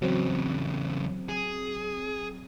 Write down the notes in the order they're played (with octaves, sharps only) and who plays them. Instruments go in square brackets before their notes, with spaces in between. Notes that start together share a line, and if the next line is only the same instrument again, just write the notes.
[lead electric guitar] E2 C#3 [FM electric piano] F#3 C4
[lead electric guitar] G#4